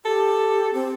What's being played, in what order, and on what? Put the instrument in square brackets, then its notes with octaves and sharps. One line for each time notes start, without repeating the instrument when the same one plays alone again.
[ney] G4 [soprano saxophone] A4
[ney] C4